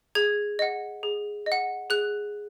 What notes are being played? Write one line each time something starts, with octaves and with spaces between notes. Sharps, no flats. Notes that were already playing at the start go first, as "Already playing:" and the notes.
G#4 G#6
D#5 F#5
G#4
D#5
F#5
G#4 F#6